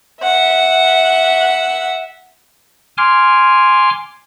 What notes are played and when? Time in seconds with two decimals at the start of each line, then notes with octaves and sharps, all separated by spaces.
0.23 E5 F#5
2.98 G#5 C6 D6 F6